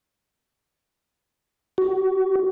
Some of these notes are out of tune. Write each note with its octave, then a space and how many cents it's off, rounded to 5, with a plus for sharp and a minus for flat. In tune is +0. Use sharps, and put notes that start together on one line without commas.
F#4 +35